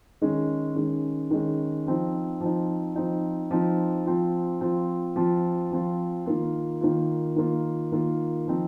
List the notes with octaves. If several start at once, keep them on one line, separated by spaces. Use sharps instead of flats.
D#3 G#3 C#4
D#3 G#3 C#4
D#3 G#3 C#4
F3 C4 D#4
F3 C4 D#4
F3 C4 D#4
F3 C4 D#4
F3 C4 F4
F3 C4 F4
F3 C4 F4
F3 C4 F4
D#3 A#3 F4
D#3 A#3 F4
D#3 A#3 F4
D#3 A#3 F4
F3 C4 D#4